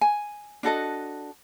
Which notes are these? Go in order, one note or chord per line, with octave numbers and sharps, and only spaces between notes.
G#5
D4 F#4 A4 D#5